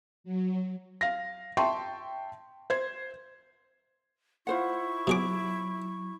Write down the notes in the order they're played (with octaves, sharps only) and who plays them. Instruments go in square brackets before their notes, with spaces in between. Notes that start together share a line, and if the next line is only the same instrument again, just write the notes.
[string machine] F#3
[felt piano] F5 A#6
E5 G5 A5 C6 C#6
C5 G#6
[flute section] E4 C#6 [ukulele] F4 C5 F#5
[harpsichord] B2 G#4 D6 [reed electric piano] F#3